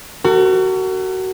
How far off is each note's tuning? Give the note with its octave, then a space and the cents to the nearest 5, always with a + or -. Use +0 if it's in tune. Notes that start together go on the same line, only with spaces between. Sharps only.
F#4 +25 A#4 -40